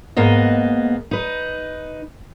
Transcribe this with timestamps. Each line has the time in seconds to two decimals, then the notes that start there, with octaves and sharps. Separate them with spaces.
0.17 G#2 A#3 B3 D#5
1.11 D#4 B4